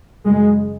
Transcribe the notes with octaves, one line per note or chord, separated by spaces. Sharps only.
F#2 C#3 G#3